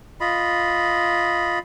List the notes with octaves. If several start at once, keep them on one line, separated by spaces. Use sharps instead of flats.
F4 D#5 B5